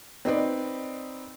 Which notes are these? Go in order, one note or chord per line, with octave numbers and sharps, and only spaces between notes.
C4 D#4 B4 D5